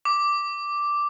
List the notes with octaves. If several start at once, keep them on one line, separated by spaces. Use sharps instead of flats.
D6